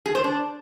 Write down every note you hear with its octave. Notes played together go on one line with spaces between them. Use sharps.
G#4
C5
D4